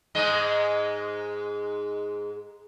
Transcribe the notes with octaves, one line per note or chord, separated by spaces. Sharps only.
G#2 G#3 D#5